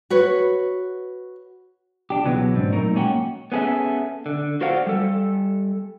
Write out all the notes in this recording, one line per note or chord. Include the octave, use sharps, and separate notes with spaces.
F#4 B4 C#5
D4 G4
C#2 B2 E3 F#3 G#3 B3
G#2 C4 D4
A#2 F#3 A3 D#4 A#4
G#3 A#3 C#4 F#4 F#5 G5
B3 C#4 G#4 A4 E5
D3
F#4 A4 C5 D5 F5 F#5
G3 A4